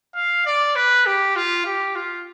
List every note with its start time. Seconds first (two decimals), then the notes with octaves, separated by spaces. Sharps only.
0.15 F5
0.46 D5
0.76 B4
1.06 G4
1.36 F4
1.66 G4
1.96 F4